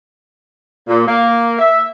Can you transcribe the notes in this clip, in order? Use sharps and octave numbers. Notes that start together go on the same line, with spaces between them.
A#2
A#3
E5